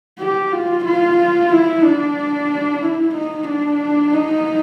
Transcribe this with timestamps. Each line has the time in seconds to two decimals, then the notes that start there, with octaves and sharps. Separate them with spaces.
0.19 G4
0.53 F4
0.85 F4
1.51 E4
1.84 D4
2.83 E4
3.15 D#4
3.48 D4
4.13 D#4